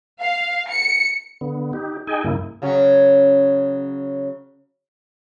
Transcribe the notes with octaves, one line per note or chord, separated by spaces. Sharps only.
F5
C#7
D3 B3
D#4 G4
D#4 G#4 D#5 G5 G#5
G2 C#3 A#3 E4
C#3 F#3 C#4